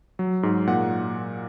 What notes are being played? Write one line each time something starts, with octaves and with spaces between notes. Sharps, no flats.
F#3
G#2
A#2 F#5